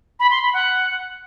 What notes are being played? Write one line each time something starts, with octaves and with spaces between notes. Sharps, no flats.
B5
C6
B5
F#5